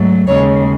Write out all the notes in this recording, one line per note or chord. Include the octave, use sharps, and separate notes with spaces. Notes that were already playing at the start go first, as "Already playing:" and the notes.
Already playing: G#2 F#3 A3
D#2 C#3 G#3 C#5